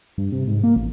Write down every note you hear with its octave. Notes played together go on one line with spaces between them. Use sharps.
G2
C3
G#2
A#3
A1